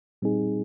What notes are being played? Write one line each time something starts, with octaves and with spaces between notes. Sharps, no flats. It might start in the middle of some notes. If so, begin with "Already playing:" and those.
A#2 G3 C4 D#4 G#4